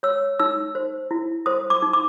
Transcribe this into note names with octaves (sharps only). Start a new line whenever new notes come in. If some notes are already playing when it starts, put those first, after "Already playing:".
C#5 E6
D#4 E6
C5
E4
C5 D#6
D6
D#4
D6